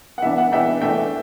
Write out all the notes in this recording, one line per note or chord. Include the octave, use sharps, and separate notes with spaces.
F#5
E3 B3 D4 E5
F#5
E3 B3 D4 E5 G5
E3 A3 D4 E5 G5